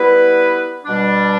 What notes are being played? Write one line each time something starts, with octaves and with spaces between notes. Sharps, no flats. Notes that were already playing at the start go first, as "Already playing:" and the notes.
Already playing: G3 B3 E4 B4
B2 G3 D4